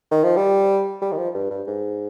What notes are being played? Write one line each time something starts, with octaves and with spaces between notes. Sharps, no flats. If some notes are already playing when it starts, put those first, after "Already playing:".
D#3
F3
G3
G3
D#3
F3
G2
G2
G#2